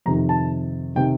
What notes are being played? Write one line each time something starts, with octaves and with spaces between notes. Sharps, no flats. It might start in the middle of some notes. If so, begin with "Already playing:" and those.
F2 C3 D#3 A#5
A5
C3 D#3 G5